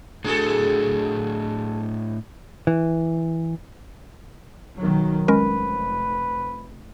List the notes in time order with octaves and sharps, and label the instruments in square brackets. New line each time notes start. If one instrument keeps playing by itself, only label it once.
[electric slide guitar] A2 D4 F#4 [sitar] G#4 A4
[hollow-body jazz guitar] E3
[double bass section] B1 D#3 F#3
[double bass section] F1 [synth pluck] G#3 C#4 A#4 [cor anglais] B4